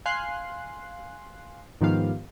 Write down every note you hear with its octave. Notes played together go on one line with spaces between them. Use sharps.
F5 G#5 C6 F#6 C7
G#2 D#3 F3 B3 G4 F5